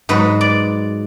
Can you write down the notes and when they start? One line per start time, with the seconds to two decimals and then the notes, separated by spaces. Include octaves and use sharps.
0.09 G#2 F#3 B4
0.41 D5